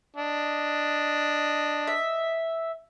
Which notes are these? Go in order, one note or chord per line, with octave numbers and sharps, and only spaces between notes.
D4 D#5
E5